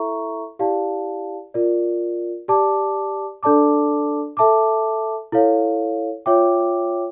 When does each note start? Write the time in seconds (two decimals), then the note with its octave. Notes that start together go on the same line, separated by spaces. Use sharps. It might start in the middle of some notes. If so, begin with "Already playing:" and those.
Already playing: E4 A4 E5 A#5 C#6
0.59 E4 G4 D5 F5 A5
1.54 F4 A#4 D5
2.48 G4 D5 A5 D6
3.43 D4 A4 D5 A5 D6
4.37 A4 E5 A5 D6
5.32 E4 A4 C#5 F5
6.26 F4 C#5 E5 G5 D6